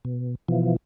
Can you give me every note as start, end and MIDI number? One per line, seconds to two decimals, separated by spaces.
0.05 0.35 47
0.48 0.76 47
0.48 0.76 52
0.48 0.76 53